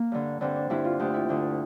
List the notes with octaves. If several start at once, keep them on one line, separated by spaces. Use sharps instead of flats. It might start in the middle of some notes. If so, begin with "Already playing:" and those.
Already playing: A#3
G2 D3
G2 D3 C4
D4
G2 D3 E4
F4
D2 D3 G4
E4
D2 D3